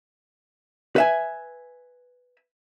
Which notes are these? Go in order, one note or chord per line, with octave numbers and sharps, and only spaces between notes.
B4 E5 G#5